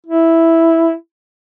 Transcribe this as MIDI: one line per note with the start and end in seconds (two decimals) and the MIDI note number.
0.06 0.93 64